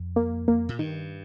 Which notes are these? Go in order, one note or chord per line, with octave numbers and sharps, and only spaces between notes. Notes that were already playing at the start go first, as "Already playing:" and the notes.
Already playing: F2
A#3
A#3
A#2
G2 D#3